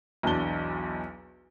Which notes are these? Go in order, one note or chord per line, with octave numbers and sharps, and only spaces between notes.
B1 E2 D4 A5 G7